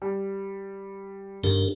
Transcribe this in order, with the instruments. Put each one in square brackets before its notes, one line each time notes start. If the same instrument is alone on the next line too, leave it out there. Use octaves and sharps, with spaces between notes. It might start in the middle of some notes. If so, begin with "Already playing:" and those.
[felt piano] G3
[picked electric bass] G2 D#3 [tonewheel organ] D4 G4 A#4